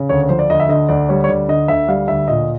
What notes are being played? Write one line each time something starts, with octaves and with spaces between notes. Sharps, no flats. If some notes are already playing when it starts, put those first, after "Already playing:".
Already playing: C#3
D2 C#5
C#5
F3 C5
D5
D2 D#5
E5
D3 D#5
D2 D5
G3 C#5
C#5
D2 D5
D3 D#5
D2 E5
G3 F5
D2 E5
A#2 D#5